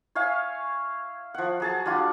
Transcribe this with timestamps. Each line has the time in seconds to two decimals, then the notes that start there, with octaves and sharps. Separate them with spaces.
0.15 C#5 E5 F5 G#5
1.34 F3 F#5
1.60 F#3 G#4 A5
1.86 G3 D4 F4 F#4